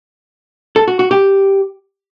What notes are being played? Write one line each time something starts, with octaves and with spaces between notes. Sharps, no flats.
A4
F#4
F#4
G4